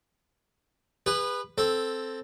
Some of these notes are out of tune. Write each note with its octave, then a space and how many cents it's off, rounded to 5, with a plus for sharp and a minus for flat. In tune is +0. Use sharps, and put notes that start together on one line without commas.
G#4 -35 B4 +0
C4 +0 A4 +0